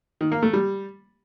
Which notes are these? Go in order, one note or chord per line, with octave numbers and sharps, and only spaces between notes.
D#3
A#3
A3
G3